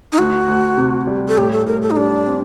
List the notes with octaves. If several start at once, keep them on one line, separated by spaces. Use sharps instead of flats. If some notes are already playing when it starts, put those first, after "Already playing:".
D#4
D2 F#4
D2
C3
G3
A4
A2 G4
A4
A2 A#4
A4
D#4
G3 D4
C4